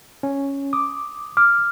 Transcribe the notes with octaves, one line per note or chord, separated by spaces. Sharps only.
C#4
D6 D#6
D6 F6